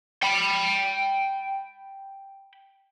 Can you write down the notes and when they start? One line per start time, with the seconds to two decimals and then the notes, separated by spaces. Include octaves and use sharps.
0.23 G5 B5